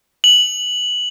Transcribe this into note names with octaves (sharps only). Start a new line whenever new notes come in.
F#7